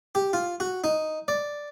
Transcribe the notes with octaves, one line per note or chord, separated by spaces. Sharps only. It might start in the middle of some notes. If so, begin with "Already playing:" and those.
G4
F4
F#4
D#4
D5